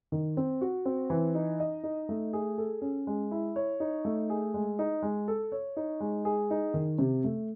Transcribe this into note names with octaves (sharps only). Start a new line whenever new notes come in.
D#3
C4
F#4
C4
E3
D#4
D#5
D#4
A3
G#4
A4
C#4
G#3
E4
C#5
D#4
A3
G#4
G#3
D#4
G#3
A4
C#5
D#4
G#3
G#4
D#4
D#3
C3
A3